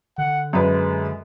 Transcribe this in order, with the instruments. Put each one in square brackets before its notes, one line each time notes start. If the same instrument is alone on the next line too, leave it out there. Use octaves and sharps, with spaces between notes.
[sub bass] D3 [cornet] F#5
[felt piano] F#2 B4 [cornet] G#3